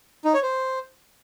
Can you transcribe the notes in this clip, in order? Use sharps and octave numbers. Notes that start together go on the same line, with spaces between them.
D#4
C#5
C5